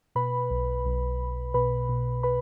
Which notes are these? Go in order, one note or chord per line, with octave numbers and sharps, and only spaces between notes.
B2 B4 B5
B1
B1
B1
B2 B4 B5
B2
B4 B5